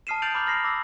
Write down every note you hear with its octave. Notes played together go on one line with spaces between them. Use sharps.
A5 D#6 F6 C7 D#7 E7
D#6 G6 A6 D7 F7 F#7
A#5 B5 D6 D#6 F6 G6
F6 A#6 C7
D6 E6 A#6